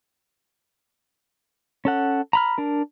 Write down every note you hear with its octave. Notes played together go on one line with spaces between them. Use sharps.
C#4 A4 F#5
A#5 B5 F6
D4 A#4